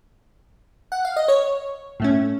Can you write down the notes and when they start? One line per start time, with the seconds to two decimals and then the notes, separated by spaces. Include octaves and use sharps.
0.92 F#5
1.05 F5
1.16 D#5
1.28 C#5
2.00 A2 A3 C#4